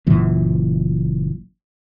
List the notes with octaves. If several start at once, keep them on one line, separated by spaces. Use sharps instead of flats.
F#1 F#2 A#2 E3